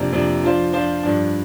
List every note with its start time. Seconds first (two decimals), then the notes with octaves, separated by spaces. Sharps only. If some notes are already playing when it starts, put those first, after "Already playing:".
Already playing: F2 C3 A#3 D4
0.13 F2 C3 A#3 D4
0.43 F3 D4 F4 C5
0.73 F3 D4 F4 C5
1.03 G2 F3 D4